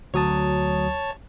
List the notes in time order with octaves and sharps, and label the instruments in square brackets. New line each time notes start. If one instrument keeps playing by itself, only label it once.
[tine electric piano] D2 F#3 D#6 [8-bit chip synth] C#5 A5